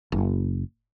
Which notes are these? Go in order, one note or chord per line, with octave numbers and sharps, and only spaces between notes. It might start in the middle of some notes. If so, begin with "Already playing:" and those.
F#1